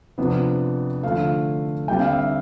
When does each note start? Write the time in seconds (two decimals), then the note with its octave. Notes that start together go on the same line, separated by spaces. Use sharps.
0.18 F2 C3 F3 B3 D4
1.03 D3 F3 A3 F5
1.88 D3 G3 C4 G5
1.99 F5
2.09 E5
2.19 F5